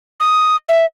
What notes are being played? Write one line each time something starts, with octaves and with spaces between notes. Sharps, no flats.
D#6
E5